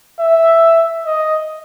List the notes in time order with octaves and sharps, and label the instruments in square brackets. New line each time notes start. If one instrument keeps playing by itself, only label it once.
[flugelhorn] E5
D#5